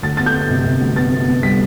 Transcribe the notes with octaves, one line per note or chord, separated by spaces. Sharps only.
D2 A6
B3 A6
G6
B3
C3
C3
D2
B3 A6
B3
B3
G3 B6